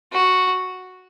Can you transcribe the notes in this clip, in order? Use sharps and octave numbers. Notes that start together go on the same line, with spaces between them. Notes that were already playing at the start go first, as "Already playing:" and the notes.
F#4